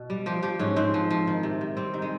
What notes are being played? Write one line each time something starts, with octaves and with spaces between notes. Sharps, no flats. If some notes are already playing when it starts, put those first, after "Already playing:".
Already playing: B2
G3
F3 G4
F3 G4
G#2 C#4
G#2 C4
F3
F3
D#3
C3
C3
G3 C4
D#3
G#3